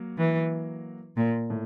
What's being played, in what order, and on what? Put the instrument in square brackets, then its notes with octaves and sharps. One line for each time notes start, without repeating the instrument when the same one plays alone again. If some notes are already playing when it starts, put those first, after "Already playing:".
Already playing: [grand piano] F#3 A#3
[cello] E3
A#2
[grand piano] A2